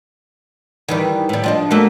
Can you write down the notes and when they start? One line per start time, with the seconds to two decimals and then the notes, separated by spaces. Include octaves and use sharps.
0.89 D#3 E3 G3
1.29 A2 G3
1.44 F3 D4 D#5
1.71 A3 A#3 F#4